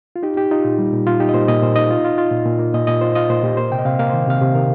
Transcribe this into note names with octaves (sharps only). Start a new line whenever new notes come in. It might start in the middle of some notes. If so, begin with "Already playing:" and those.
F4
D#4 G4
D#4 G4
D#4 F4
A#2
G3
A#2
A#2 F4
D#4 G4
D#5
A#2 C5
A#2 D#5
A#2 C5
D#4 D#5
F4
F4
F4
A#2
A#2
A#3
A#2 D#5
A#2 D#5
F4 C5
F4 D#5
A#2 C5
A#2 G4
A#3 C5
C3 G5
D#5
C3 F5
A#3 F5
C5
D#3
C3 F5
C3 G4
D#3 A#4